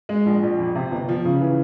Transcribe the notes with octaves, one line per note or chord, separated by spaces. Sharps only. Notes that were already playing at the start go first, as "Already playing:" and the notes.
G#3
A#1
A#1
F2
C3
G1
F3
C#3
E3